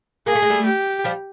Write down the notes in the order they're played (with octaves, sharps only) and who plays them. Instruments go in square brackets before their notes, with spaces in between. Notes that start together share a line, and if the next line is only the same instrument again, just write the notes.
[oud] A#3 [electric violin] G#4
[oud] A3
G#3
G3 A3
[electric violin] G4
[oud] F3 G3